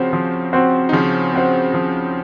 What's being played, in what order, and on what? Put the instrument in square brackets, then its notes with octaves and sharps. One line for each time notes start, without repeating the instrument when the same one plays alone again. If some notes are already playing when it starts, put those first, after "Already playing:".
Already playing: [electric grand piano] C#3 C#4 [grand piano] F3 C4 F#4 C5
[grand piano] F3
C4 F#4 C5
[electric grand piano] D#4
[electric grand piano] C#3 C#4 [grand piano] F3
[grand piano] C4 F#4 C5
F3